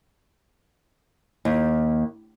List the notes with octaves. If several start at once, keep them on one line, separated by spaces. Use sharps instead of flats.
D#2